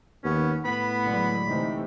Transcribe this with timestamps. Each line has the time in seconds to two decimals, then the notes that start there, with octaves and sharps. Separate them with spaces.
0.24 D#2 B3 C#4
0.65 A2 B3 B5
1.04 D3 F#3 G#3
1.48 C3 E3 A3 D#4